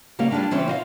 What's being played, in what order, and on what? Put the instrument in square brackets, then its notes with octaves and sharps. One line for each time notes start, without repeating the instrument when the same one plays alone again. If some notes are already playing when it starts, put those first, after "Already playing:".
[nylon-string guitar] C#3 G3 A#3 F5
G3 D4 D#4 F4 G#4
C#3 E3 C4 C#4
F4 D#5 F5